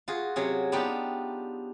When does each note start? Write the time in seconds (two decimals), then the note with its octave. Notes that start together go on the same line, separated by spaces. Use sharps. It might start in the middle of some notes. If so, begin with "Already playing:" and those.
0.08 F4 F#4 G#4
0.36 C3 F#3 C#4 G#4
0.72 B3 D4 D#4 F4 G4